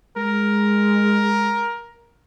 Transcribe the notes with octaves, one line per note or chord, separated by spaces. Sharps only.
G#3 A#4